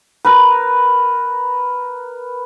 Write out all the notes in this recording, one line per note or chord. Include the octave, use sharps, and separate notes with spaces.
A#4 B4